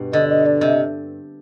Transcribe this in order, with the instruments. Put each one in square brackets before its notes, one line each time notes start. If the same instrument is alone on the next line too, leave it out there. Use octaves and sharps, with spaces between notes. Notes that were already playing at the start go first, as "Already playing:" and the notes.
Already playing: [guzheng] G2 B2
[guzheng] D3 [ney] D#5
[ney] D#5
D5
[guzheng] C3 [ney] D#5